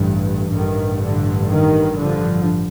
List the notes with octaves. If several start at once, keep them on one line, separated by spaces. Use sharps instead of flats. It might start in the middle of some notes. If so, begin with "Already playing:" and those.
Already playing: A1 G2
A1 G2 D#3
D3
D#3
D3 F3